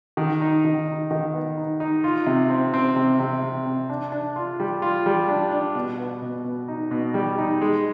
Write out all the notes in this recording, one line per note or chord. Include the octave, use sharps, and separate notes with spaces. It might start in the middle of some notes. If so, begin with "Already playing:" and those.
D#3
D#4
D#3
D#4
D#3
B3
D#4
D#4
F4
C3
C4
C4
C3
C3
C3
C3
D4
D4
F4
G3
F4
G3
D4
D4
B2
B3
B2
B2
D#4
B2
G3
D#4
G#3